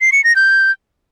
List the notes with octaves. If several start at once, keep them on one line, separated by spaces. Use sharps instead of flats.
C7
C#7
A#6
G6